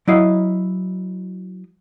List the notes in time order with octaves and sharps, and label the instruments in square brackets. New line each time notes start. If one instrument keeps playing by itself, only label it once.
[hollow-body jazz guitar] F#3 E4 D#5 F5